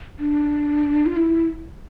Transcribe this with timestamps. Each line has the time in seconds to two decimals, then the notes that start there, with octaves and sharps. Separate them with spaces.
0.20 D4
1.06 F4
1.17 E4